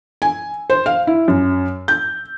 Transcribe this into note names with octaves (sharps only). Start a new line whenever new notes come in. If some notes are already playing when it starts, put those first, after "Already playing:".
G#5
C5
F5
E4
F#2
G6